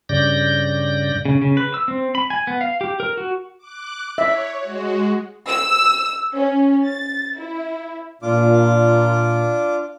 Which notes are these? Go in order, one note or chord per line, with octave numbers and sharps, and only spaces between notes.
G2 C#3 D5 G6 A#6
C#3
C#3
B4
E6
C4
B5
G#5
B3
F5
G4
A#4
F#4
D6 F#6
C#5 E5
G#3 F#4
E6
C#4
A6
E4
A#2 D4 F4 D6